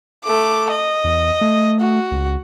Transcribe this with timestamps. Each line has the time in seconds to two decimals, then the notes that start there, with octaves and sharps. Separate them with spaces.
0.25 A3 D6
0.71 D#5
1.04 E2
1.41 A3
1.80 F#4
2.12 C#2